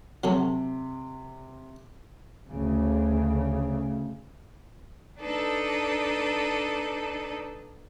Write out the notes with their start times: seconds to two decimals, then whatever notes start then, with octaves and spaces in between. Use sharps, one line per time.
0.24 C3 F#3 A4 C#5
2.48 D2 C#3
5.19 D4 D#4 A4 B4